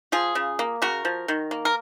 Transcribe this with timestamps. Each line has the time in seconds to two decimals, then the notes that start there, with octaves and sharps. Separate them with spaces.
0.12 F3 F4 G#4
0.35 C#3
0.59 A#3
0.82 C#3 F#4 A#4
1.05 F3
1.28 D#3
1.51 A#3
1.65 A#4